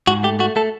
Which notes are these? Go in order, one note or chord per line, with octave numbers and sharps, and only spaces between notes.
G#2 F#4
A3 G4
A3 F#4
A3 A4